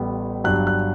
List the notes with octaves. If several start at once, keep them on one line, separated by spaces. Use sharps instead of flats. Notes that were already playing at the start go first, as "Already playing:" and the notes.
Already playing: A1 A2 G3 B3
G1 G2 F#3 F#6
F#6